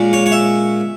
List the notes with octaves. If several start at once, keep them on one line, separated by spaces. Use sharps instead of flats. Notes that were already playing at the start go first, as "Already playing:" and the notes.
Already playing: A#2 G#3 C#4
C#5
C#5
E5